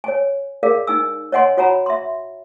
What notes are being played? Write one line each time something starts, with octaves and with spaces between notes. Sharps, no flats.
C#5 G#5
G#4 A#4 D5 F5
D#4 G#5 E6
C#5 D#5 F#5 G#5 C6
F#4 C#5 F#5 G#5 A#5 B5
E5 C6